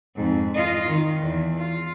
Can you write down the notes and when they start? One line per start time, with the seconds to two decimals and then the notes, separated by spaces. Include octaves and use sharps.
0.16 F2 G#2
0.55 F4 D#5
0.87 D#3
1.18 E2
1.59 F4